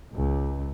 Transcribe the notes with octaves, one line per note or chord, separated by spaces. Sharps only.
C#2